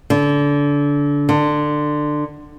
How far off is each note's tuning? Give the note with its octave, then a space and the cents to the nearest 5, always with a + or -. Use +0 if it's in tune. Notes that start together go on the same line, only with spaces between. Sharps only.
D3 -25
D3 +20